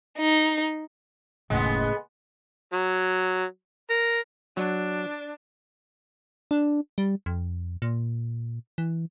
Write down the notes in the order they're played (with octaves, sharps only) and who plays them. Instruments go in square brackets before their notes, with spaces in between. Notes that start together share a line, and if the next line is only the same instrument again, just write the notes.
[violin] D#4
[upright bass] F#1 D#2 [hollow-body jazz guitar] A2 C#3 [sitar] G#3 B3
[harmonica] F#3
A#4
[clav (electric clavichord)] F#3 [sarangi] D4
[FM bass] D4
G3
F2
A#2
E3